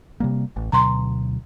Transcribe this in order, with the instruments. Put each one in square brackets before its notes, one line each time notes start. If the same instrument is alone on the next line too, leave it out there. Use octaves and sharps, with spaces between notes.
[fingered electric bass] C3 G3 A#3
A1
[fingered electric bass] D2 B2 F#3 [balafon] A#5 C6